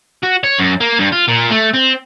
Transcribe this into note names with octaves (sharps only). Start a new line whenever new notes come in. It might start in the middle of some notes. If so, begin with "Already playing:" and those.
F#4
C#5
F#2
A#3
G2
F4
A#2
A3
C4